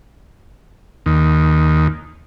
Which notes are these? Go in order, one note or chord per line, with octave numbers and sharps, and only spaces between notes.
D#2